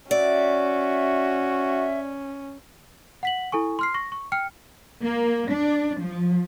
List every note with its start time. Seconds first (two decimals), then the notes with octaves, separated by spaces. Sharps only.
0.11 C#4 F#4 D5 E5
3.23 F#5 B6 F#7
3.52 E4 A4 G#5 C#6
3.79 C6 F6 C7
3.94 C#6 A#6
4.12 C#6
4.32 G5 F6 C#7
5.01 A#3
5.50 D4
5.99 F3